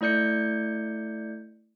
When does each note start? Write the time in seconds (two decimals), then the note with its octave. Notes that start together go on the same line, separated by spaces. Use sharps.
0.01 A3 E4 D5 G6 C#7